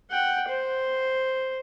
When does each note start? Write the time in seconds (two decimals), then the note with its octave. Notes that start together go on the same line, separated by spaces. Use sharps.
0.11 F#5 G5
0.48 C5